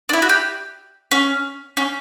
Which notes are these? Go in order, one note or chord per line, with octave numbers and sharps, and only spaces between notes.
D4
E4
F#4
G4
C#4
C#4